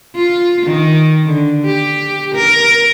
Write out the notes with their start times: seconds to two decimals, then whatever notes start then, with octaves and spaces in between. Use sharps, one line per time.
0.15 F4
0.66 D#3
1.25 D3
1.65 G4
2.35 A#4